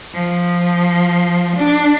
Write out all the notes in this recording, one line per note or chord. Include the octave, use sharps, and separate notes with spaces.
F3
D4